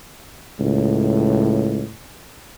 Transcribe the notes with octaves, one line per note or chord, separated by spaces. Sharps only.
C#2 A2